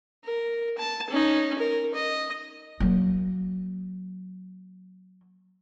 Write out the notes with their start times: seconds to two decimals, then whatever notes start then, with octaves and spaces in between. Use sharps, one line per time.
0.25 A#4
0.78 A5
1.10 C#4 D#4
1.58 A#4
1.94 D#5
2.80 F#3 A#3